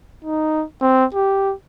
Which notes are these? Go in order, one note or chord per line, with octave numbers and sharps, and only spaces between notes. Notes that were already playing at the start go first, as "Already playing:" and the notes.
D#4
C4
G4